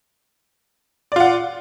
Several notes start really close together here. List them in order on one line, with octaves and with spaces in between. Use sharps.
D5 F4 F#5